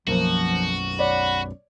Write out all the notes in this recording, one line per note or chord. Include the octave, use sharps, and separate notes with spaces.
B1 F#2 F3 A#3 F#4
C#5 D5 F#5 B5